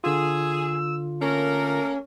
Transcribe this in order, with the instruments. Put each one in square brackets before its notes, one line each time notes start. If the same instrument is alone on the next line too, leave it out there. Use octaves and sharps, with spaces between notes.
[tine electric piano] D3 F4 [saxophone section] G#4 [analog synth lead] E6
[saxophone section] A3 A#3 A#4 [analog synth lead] C#4